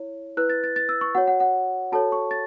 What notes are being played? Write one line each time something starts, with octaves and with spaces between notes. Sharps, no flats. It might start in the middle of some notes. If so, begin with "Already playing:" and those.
Already playing: E4 C#5
E4 B4 F#6
A6
A6
A6
E6
C#6
F#4 C#5 F#5
F#5
F#5
F#4 A4 C#5 A5
C#6
A6